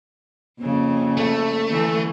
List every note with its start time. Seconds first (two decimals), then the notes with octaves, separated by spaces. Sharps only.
0.61 F2 C#3 A#3
1.17 A3
1.69 D3 E3